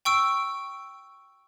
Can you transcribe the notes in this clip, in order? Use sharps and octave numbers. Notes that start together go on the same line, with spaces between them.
G5 C#6 E6 D7